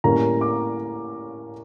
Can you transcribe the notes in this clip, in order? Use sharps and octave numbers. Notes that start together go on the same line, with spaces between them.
A2 G3 A#3 C#4 A#5
D6